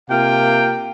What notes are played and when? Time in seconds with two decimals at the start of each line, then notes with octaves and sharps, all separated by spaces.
0.10 C3 A#3 F4 F5 G5